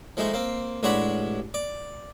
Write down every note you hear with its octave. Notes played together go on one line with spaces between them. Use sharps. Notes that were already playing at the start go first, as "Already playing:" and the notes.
F3 G#3 A3 D#4
A#3 C4
A1 G#3 D4 C#5 F#5 B5
D5